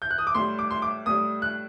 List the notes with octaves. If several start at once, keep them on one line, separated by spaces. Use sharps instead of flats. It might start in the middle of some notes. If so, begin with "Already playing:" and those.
G6
F#6
D#6
D6
A2 G3 C6
D6
C6
D6
A2 G3 D#6
F#6